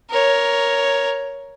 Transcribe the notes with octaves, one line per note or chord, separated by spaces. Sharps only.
A#4 C#5